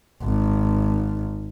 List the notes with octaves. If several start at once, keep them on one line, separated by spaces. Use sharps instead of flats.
G#1